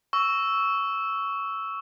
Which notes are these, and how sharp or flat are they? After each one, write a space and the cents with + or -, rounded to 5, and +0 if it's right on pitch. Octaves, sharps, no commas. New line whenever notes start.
C#6 +15 E6 +0